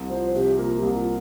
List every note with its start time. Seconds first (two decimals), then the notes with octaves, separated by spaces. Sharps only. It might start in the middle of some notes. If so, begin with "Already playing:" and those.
Already playing: C2
0.10 F3 C5
0.34 C3 G4
0.58 A#3 F4
0.77 G4
0.83 C2
0.95 F4